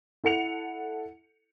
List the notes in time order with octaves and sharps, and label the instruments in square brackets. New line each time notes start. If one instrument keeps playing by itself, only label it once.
[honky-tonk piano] E4 A4 F#5 C#7 F7